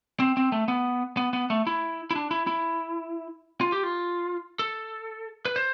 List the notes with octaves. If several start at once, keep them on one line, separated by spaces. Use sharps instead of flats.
C4
C4
A3
B3
B3
B3
A3
E4
E4
D4
E4
E4
F4
G4
F4
A4
B4
C5